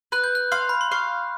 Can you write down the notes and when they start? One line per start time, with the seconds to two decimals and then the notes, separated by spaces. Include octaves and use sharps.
0.12 B4 F#6
0.24 G6
0.35 F#6
0.52 F5 C6
0.69 B5
0.81 C6
0.91 F5 C#6